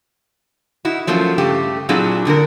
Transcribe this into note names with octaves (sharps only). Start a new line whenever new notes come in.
D#4 E4 F#4
F3 F#3 A3 A#3 C#4
G2 C#3 A3 G4
A#2 F#3 C4 D4 E4 G#4
E2 D3 D4 A#4